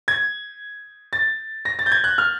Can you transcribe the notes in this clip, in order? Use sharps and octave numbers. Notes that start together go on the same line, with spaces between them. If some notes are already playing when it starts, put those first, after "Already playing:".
G#6
A6
A#6
A6
G6
G#6
F#6
F6